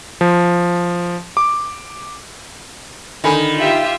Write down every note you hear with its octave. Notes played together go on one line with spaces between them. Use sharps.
F3
D6
D3 D#3 G#5 B5
F4 G4 E5